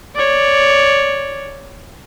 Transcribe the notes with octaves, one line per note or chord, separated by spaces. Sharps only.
C#5 D5